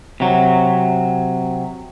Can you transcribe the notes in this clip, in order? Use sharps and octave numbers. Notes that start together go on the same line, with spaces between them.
C3 F#3